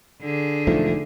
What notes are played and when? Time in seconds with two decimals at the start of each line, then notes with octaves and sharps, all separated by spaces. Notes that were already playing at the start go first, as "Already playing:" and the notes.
0.22 D3 G#4
0.67 E1 F3 A3 D#4